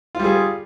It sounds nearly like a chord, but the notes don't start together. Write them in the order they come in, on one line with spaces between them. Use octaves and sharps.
F4 G3 G#4